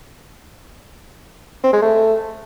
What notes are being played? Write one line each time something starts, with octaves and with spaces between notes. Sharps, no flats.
C4
G#3
A3